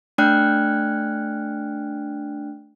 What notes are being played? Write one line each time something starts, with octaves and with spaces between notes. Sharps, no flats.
A3 D4 D5 G5 F6 F#6